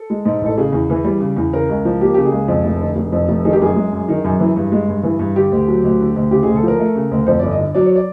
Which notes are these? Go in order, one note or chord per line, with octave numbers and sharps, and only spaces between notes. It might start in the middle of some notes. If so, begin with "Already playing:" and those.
Already playing: A4
G#3
G#2
A1 A4
C#3 G#4
E2
E3
G3
C#3
E2
C#3 A#4
C#2
F3
A#3 G4
C#3 G4
G#4
C#2
F2
F1
D3
F1
F2
F1
D#3 G#4
G4
F#2 G#4
G#3
F#2
D#3
F#2
E3
G2
G#3
G2
E3
G2
D3 G4
D2
F#3
D2
D3
D2
C#3 G4
D2 G#4
A4
F3 A#4
A3
C#3
D2
F2 C5
G1 D5
D#5
D3
F#3 D5
C#5
D5